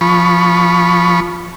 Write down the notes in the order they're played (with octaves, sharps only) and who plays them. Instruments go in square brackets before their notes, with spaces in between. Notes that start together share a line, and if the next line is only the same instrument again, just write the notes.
[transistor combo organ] F3 B5 C#6